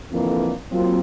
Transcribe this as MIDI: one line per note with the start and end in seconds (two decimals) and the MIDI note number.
0.11 0.51 41
0.11 0.51 50
0.11 0.51 52
0.11 0.51 58
0.72 1.00 54
0.72 1.00 58
0.72 1.00 60
0.72 1.00 65